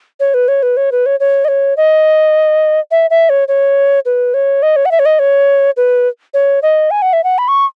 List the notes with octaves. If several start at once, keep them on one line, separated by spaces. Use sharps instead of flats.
C#5
B4
C#5
B4
C#5
B4
C#5
C#5
D#5
C#5
D#5
E5
E5
C#5
C#5
B4
C#5
D#5
C#5
F#5
E5
C#5
D#5
C#5
B4
C#5
D#5
G#5
F#5
E5
F#5
B5
C#6